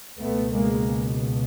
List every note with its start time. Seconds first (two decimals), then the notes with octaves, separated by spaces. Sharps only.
0.19 C#2 B2 A3 B3
0.54 G#3 A#3